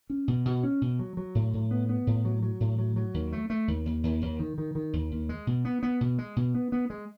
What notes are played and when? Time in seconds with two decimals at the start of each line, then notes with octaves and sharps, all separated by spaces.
0.10 C#4
0.28 B2
0.45 B2
0.63 C#4
0.81 B2
0.99 F#3
1.17 F#3
1.35 A2
1.53 A2
1.71 B3
1.89 B3
2.07 A2
2.25 F#3
2.43 F#3
2.60 A2
2.78 F#3
2.96 F#3
3.14 D#2
3.32 A3
3.50 A3
3.68 D#2
3.86 D#2
4.03 D#2
4.22 D#2
4.39 D#3
4.58 D#3
4.75 D#3
4.93 D#2
5.11 D#2
5.29 G#3
5.47 B2
5.65 B3
5.83 B3
6.01 B2
6.18 G#3
6.36 B2
6.55 B3
6.72 B3
6.90 G#3